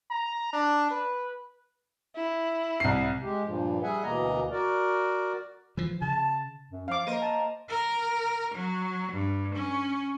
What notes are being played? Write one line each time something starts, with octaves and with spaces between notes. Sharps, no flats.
A#5
D4
B4
E4
C2 C7
G#3 G4
G2 A#2 F3
G3 G#4 E5 F#5 G#5
D2 B2 E3 A#3 D#5 A#5
F#4 A#4 D5
E3 F3
C#3 A5
F#2
F3 F5 D6
A#3 A#4 C5 D#5
A5
A#4
F#3
G2
C#4